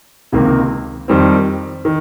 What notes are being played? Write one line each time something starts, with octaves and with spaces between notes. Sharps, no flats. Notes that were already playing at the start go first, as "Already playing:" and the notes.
C#2 C3 D#3 A#3
F2 D#3 G3 C4
D#3